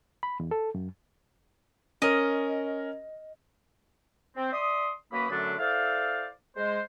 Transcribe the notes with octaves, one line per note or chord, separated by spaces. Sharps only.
B5
E2
A4
F#2
C#4 A#4 D#5
C4
D5 E5 C6 D#6
F#2 A#3 F#4 B4 B5 D#6
F#2 D3 F#3 A3 D4
E4 A4 C5 D5 F5
G#3 C5